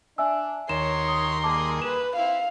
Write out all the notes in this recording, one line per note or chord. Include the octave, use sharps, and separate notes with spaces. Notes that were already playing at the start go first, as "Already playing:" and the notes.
D4 E5 G#5 E6
D#2 A#4 C#5 C6 E7
D#6
G3 A#3 G#4 A5 D6
B4 E7
C4 E4 F5